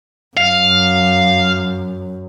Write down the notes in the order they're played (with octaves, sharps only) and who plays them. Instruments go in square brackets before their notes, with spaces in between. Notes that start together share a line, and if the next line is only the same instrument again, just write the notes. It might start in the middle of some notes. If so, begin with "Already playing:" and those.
[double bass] F#2 [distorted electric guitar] F5